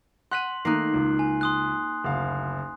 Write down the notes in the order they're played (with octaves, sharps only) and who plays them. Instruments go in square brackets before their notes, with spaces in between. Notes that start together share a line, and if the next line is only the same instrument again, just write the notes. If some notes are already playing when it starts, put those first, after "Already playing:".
[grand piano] F#5 [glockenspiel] C6 F#7 [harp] F#6 B6 D#7
[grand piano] D#3 A3 [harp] A#3 D#4 [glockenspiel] F#6 C7
[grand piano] C#2
[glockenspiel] G#5
C6 D#6 F#6
[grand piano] F#1 D2 F5